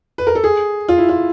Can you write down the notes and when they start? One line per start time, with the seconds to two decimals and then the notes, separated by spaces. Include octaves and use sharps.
0.18 B4
0.27 A#4
0.35 A4
0.44 G#4
0.89 F4
0.98 E4
1.09 F4